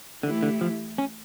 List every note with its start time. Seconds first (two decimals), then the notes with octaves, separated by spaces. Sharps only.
0.23 D3 E3 A3 E4 G4
0.43 D3
0.61 F3
0.98 C#4